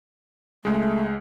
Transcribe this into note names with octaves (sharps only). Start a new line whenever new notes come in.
C#2 G#3 A3